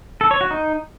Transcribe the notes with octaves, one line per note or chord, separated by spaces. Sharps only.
A4
C#5
F#4
D#4